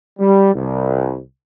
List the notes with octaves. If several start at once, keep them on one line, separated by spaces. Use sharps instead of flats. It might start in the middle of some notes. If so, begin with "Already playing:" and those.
G3
C2